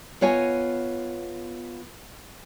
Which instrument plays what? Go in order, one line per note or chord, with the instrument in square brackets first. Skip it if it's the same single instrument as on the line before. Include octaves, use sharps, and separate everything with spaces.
[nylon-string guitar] B3 F4 C#5 D#5 G#5